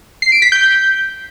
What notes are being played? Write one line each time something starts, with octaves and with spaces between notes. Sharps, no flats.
C7
D7
B6
G6